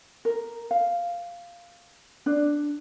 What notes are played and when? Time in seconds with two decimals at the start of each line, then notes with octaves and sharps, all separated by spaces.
0.25 A#4
0.71 F5
2.26 D4